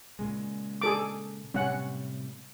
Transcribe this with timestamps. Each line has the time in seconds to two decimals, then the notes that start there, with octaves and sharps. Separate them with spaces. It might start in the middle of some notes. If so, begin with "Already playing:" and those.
0.19 A#2 C#3 G#3
0.82 G#4 A4 D6
1.54 A2 C3 G3 C#4 F#5